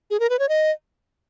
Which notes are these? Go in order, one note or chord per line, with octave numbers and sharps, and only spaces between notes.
G#4
A#4
B4
C#5
D#5